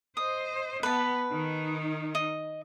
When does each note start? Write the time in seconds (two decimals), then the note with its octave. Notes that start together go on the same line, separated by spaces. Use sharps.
0.17 C5 D#5 D#6
0.83 B3 B4 A5
1.32 D#3 D#4
2.15 D#5